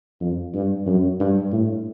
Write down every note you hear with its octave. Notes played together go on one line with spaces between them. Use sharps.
F2
G2
F#2
G2
A2